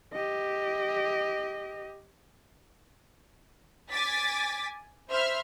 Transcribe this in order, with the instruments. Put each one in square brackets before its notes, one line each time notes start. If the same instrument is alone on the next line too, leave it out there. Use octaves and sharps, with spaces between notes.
[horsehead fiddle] G4 D#5
[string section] G#5 D6 A6 B6
C5 E5 B5 F6